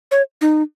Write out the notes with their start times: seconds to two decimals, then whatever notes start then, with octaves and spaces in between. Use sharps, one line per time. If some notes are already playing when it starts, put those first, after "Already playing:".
0.11 C#5
0.41 D#4